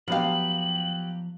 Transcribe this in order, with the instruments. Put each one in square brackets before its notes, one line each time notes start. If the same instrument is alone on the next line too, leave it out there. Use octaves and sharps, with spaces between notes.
[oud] F3 F5 [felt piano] F#3 B3 G4 [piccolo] F#7